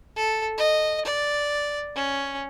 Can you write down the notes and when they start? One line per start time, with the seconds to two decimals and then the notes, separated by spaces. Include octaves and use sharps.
0.16 A4
0.58 D#5
1.05 D5
1.96 C#4